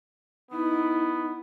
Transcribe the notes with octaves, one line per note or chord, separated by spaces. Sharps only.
B3 D#4 E4